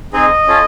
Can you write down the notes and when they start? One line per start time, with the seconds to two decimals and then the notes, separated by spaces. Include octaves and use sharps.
0.13 C4 D#4 G#4 D#5
0.47 C#4 F4 A4